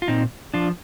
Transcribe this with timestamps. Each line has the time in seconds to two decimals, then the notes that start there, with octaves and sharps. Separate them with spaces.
0.02 F4
0.08 A#2 C4 D#4
0.54 F3 D4 F4